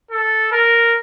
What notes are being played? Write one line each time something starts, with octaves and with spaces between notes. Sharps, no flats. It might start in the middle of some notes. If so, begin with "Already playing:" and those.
A4
A#4